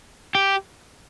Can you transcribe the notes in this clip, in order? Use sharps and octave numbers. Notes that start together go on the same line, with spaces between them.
G4